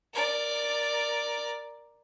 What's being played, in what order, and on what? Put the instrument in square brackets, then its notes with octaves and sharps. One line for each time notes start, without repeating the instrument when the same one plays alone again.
[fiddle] A#4 D5